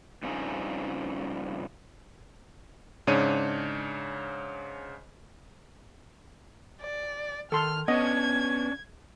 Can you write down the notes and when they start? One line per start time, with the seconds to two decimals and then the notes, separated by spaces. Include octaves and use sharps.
0.23 G2 C#3 F3 C4 C#4 D#4
3.07 G#2 C#3 D4 C#5 D#7
6.81 D5
7.52 D#3 A4 C6 F6
7.88 B3 C#4 D4 C#5 D#5 G#6